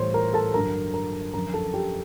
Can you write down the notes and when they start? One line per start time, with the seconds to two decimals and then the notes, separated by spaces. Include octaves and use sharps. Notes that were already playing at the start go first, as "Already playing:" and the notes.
Already playing: A2 E3 G3 C5 C#5 C6
0.14 A#4 A#5
0.33 A4 A5
0.54 G2 D3 F#3 A#4 A#5
0.94 A#4 A#5
1.34 F#2 D3 F3 A#4 A#5
1.54 A4 A5
1.73 G4 G5